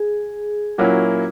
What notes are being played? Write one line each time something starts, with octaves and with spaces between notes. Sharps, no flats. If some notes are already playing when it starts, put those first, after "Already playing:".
Already playing: G#4
A#2 F#3 A#3 C#4 E4 F#4